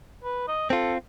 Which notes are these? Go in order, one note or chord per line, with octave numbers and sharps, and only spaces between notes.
B4
D#5
C4 F4 A4